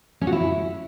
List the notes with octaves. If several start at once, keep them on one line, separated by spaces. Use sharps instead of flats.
C#4
F#4
E4